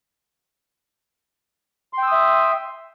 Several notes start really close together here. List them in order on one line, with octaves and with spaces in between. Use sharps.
C6 G5 E6 D#6 E5